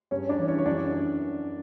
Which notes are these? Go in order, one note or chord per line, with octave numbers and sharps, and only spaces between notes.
G2 C#4 C#5
D4 D5
E3
C#4 C#5
C#5
F#2 D4 D5